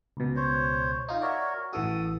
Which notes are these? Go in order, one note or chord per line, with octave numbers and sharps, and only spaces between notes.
C#2 B2
C5 C#5
D#4 F4
F#4 A#4 C#5 D5 E5
A1 E3 F#4 A4 D#6